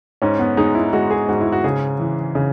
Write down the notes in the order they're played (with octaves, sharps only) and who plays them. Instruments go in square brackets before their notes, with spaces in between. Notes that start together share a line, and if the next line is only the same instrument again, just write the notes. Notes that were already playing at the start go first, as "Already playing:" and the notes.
[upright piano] G#2 C#4
B3
G#3 D#4
E4
G#3 F#4
G#4
G#2 F#4
E4
F#4
C#3 G#4
E3
C#3